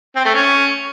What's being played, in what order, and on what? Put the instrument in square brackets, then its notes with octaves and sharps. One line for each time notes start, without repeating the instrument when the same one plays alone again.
[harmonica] C4
A3
C#4